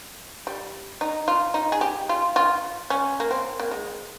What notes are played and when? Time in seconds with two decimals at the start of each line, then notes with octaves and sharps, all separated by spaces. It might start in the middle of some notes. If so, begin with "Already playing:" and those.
0.47 G3
1.01 D#4
1.28 F4
1.54 D#4
1.72 G#4
1.81 G4
2.09 F4
2.36 F4
2.90 C#4
3.20 A#3
3.31 C4
3.60 A#3
3.71 G#3